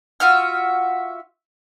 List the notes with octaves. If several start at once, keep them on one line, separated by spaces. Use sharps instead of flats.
F4 F#4 E5 F6